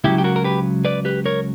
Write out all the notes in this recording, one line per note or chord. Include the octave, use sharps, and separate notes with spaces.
C#2 C#3 F#3 E4 G4
G4
F#4 A#4
A#4
G4 B4
B4 D5
G4 B4
A#4 C#5